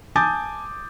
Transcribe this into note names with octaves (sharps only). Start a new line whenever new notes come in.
G#5 A5 D6 D#6 G6 A6